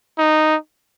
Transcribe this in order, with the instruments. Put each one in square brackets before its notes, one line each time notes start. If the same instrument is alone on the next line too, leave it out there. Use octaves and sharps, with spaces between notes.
[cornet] D#4